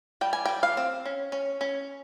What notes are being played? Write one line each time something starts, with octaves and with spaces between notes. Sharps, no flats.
G3 G5
G#5
G3 G5
F5
C4
C#4
C#4
C#4